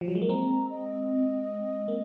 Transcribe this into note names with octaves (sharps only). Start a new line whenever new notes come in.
F3
F#3
G#3
A#3
G#3 C4 A#5
D#5
A#3